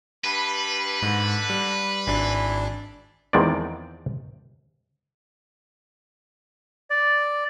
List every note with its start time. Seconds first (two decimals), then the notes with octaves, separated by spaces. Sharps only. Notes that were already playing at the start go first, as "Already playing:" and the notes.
0.25 G2 B4
1.02 G#2 D3
1.50 G3
2.07 G#1 E3 D4
3.33 E2 D#3 F3 G#3 C4 D5
6.90 D5